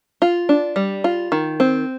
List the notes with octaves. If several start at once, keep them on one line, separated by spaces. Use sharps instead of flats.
F4
D4
G3
F4
D#3
C4